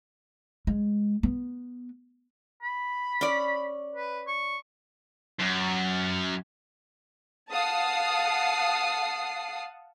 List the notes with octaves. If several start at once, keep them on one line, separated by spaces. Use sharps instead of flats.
G#3
B3
B5
C#4 D5
B4
C#6
F#2
F5 F#5 A5 D#6 C7